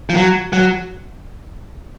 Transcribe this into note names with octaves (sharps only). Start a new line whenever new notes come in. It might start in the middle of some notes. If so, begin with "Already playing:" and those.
F3
F#3
F#3